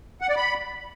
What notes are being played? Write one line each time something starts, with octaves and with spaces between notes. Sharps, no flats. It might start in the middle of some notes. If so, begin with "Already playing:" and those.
F#5
D5
B5